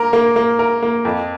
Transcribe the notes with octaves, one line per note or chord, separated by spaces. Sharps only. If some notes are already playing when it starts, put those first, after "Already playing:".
Already playing: A#3 A#4
A#3
A#3
A#4
A#3
F2